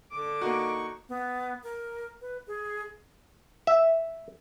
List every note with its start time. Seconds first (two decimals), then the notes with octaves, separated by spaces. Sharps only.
0.12 D3 D6
0.41 A#3 D#4 F#4 C#6
1.09 B3
1.63 A#4
2.21 B4
2.47 G#4
3.67 E5